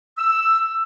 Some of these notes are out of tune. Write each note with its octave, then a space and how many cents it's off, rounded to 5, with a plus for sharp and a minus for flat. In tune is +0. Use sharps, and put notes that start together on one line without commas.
E6 +10